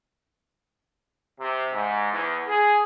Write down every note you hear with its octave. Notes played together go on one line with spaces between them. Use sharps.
C3
G#2
E2
G#4